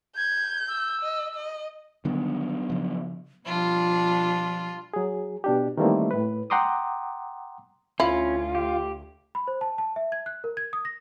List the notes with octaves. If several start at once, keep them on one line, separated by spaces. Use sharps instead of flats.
G6 G#6
E6
D#5
D#5
D3 D#3 F#3 G3 B3 D4
C#3 F3
B2 F3 G3 D4 F4
F#3 G#4
B2 D4 G4
D#3 E3 G3 A3 A#3 C4
A2 B4
F#5 G5 A#5 C6 D6 D#6
D2 C#4 E4 F4
G4
B5
C5
A5
A5
E5
G#6
F#6
A#4
G#6
D#6
A#6